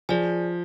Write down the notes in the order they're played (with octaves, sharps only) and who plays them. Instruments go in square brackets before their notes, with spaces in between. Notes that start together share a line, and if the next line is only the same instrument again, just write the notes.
[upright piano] F3 [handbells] G#4 D5 G#5